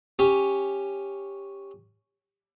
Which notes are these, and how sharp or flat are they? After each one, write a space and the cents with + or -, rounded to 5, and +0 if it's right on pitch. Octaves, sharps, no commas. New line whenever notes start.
C#4 +0 G4 +10